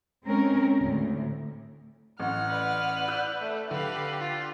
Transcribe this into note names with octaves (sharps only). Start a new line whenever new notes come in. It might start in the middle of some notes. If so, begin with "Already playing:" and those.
G#3 C4 C#4 A#4
D2 A2
A1 F#5 F6
B4 D5
E6 F#6 G6
A3
D3 G4 B4 F5
F4